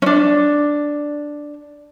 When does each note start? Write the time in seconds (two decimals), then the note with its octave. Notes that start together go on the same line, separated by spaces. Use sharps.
0.02 C#4 D4